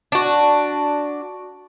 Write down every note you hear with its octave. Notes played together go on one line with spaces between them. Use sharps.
D4 F#4